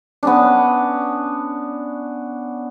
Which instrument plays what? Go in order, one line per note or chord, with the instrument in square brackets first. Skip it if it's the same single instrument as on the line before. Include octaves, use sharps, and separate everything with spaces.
[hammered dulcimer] B3 C#4 D4